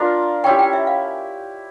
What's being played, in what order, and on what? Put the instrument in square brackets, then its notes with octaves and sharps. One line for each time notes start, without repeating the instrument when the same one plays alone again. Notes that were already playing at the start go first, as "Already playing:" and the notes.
Already playing: [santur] D4 F4 A#4
[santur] C#4 E4 G4 [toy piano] G5
[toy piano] G5
E5
F5